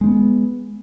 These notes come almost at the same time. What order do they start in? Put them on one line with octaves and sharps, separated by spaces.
G#3 C4 B3